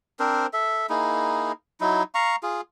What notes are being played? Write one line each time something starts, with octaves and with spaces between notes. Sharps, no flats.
C4 D4 A#4 C5
A4 E5
A#3 D#4 E4 G#4
F#3 D#4 E4
F5 A#5 C#6
F4 G#4